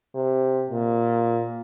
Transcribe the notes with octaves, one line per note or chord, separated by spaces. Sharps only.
C3
A#2